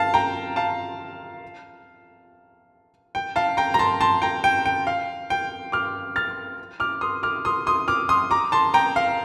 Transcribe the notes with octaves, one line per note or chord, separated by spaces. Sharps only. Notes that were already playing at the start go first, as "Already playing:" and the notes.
Already playing: F5 A5
G5 A#5
F5 A5
G5
F5 A5
G5 A#5
A#5
A5 C6
A5 C6
G5 A#5
G5
G5
F5
G5
D6 F6
F6 A6
D6 F6
C6 D#6
D6 F6
C6 D#6
C6 D#6
D6 F6
C6 D#6
A#5 D6
A5 C6
G5 A#5
F5